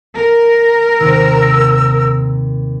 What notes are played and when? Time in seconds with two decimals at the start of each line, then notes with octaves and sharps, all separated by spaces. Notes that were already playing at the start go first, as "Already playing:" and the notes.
0.14 A#4
0.99 D#2 C3 D#3 E6